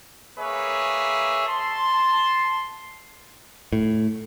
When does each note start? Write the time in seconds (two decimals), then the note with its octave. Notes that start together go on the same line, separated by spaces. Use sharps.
0.39 A#3 G#4 B4 C#5 E5
1.47 A5 C6
3.73 A2